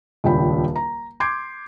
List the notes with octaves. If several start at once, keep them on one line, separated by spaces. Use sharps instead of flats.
D#1 C#2 D4 G5 B5
A#5
C6 D6 G6 G#6 C7 D7